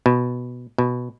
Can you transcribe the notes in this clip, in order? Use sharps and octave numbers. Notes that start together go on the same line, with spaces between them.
B2
B2